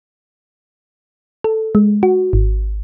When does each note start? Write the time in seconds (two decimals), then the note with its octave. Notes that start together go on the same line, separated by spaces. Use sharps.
1.44 A4
1.75 G#3
2.03 F#4
2.33 G#1